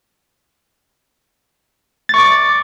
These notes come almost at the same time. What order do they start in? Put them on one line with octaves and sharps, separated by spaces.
A6 C#6 D6